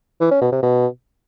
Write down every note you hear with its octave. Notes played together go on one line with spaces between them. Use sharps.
E3
C#4
B2
C3
B2